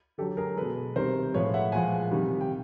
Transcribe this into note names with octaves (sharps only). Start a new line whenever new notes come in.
D3 F#3 G4 A4
G#4 A#4
B2 G#3 A4 B4
C3 D#3 G3 A#4 C5
A2 F3 G#3 B4 C#5
E5 F#5
A#2 F3 G#3 F#5 G#5
C3 D#3 G3
G5